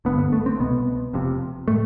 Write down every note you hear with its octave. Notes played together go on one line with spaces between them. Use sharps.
F2 D3 B3
G1
B3
A3
C4
C2 B2 B3
F1 F2 C3
A2 A3